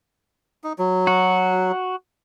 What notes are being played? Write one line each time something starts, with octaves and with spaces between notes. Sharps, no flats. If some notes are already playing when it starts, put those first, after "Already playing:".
D#4
F#3
F#4